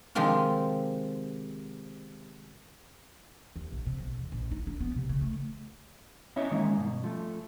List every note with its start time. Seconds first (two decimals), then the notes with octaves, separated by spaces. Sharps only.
0.15 C3 D#3 F3 G#3 C4 F4
3.56 D#2
3.72 A#1
3.86 C3
4.00 B1
4.17 E2
4.32 A#1
4.52 D#4
4.67 D4
4.80 B3
4.96 C3
5.09 C#3
5.21 A3
6.36 B3 C#4 E4 C#5 D#5 E5
6.51 D#3 E3 G#3 A#3 C#4 D#4
6.77 G2 B2
7.04 F3 A3